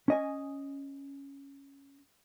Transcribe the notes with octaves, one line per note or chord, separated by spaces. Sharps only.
C#4 D#5 G#5